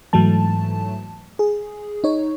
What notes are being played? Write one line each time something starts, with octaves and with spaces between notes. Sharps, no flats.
G#2 E3 F#3 A3 A5
G#4
D#4 C#5